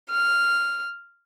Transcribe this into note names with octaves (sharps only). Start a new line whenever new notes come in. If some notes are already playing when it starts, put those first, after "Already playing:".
F6